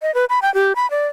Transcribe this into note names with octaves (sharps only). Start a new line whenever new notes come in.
D#5
B4
B5
G5
G4
B5
D5